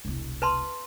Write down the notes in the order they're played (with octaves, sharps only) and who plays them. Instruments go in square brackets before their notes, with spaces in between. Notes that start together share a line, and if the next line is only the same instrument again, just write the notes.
[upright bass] E1 C2
[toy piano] B4 A5 C6